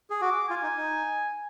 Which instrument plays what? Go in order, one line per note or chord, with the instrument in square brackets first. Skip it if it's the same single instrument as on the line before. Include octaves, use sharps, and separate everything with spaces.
[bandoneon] G#4
[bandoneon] F#4 [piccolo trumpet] D6
[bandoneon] F4 [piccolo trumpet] G#5
[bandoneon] D#4
D#4